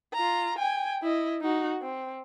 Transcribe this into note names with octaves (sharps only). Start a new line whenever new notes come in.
F4 A#5
G5 G#5
E4 D#5
D#4 F#4
C4